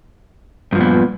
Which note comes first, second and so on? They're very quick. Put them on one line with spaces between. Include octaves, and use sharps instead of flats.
G2 F3 A#2 B3